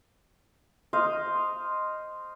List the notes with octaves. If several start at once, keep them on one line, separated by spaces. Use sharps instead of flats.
C5 D#5 F5